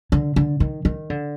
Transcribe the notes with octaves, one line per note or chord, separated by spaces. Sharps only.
D3
D3
D#3
D#3
D3